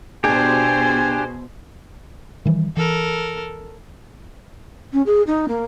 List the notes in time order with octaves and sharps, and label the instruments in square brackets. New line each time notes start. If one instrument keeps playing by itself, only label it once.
[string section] B2 C5 [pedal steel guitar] D4 G4 [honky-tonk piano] G#4 [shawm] G#5
[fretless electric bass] D#3 E3 G3
[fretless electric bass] E3 [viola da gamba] A4 A#4
[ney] C#4
G#4
D#4
A#3